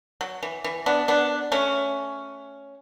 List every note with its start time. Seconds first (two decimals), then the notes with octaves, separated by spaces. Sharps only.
0.21 F#3
0.43 E3
0.64 E3
0.86 B3 D4
1.08 B3 D4
1.52 A3 C#4